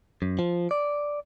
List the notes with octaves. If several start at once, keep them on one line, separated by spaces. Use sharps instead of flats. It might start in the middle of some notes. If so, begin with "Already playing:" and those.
F#2
F3
D5